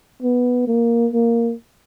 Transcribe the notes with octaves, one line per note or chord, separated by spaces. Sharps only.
B3
A#3
A#3